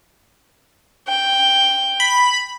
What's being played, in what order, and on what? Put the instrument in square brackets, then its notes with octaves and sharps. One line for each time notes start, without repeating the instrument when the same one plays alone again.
[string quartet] G5
[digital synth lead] B5